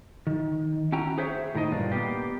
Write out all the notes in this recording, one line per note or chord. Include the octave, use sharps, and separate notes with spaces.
D#3
C#4 E4 F#4 G5 A#5
G#4 C5 C#5 E5
A2 D#3 A#4 D#5
G2 A#2 D4 F4
A#3 B3 G4